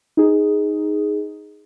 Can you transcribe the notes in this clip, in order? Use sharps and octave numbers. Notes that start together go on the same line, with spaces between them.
D#4 G#4